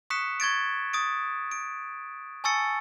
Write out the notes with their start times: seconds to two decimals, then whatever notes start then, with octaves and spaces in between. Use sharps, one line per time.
0.10 C#6 D#6 F#6 B6 C#7 E7
0.40 C#6 G#6 A6 D7
0.93 C#6 D#6 A6 D7
1.51 D7
2.44 G#5 A5 C#6 E6 A6 C#7